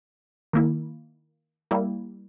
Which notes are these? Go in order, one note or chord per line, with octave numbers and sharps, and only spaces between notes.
D#3 A#3 E4
G3 A#3 E4